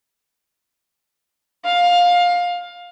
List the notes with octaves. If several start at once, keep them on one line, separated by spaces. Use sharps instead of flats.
F5